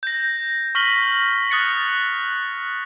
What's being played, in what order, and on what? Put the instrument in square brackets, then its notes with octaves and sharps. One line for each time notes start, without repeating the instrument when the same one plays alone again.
[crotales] G6 A#6
C#6 F6 A#6 B6 F#7 G7
D#6 F#6 A6 C#7